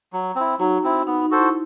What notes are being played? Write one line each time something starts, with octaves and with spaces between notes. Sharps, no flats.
F#3
C4 E4
F#3 D#4 F#4
C4 E4
B3 D#4
D#4
F#4 A4 C5
E4